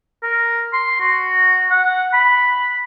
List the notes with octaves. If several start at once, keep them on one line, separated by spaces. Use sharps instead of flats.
A#4
C6
F#4
F#5
B5